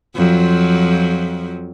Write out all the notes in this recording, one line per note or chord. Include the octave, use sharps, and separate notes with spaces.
F2 F3 F#3